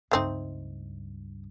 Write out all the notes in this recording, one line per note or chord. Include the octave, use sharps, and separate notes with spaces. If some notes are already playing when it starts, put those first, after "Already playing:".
C#2 G2 A3 C4 D#4